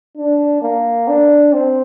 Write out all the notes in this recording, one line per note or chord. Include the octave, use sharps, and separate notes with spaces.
D4
A#3
D4
C4